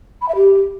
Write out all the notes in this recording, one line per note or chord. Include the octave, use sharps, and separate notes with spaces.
B5
E5
G4